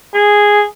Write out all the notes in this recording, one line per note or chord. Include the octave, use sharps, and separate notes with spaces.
G#4